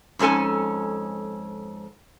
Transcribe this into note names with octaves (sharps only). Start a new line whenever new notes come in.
F2 G#2 C#4 A4 G#5